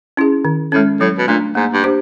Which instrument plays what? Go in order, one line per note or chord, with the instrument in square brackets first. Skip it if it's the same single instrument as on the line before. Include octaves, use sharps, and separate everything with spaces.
[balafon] C#4 E4 G#4
D#3
[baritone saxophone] A2 [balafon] G#3 C#4
[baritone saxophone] A2 [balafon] F#3
[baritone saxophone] B2
[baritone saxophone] A#2 [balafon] A3 D4
[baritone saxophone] G#2 [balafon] A#3
[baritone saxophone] G2
[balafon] D4 G4 C5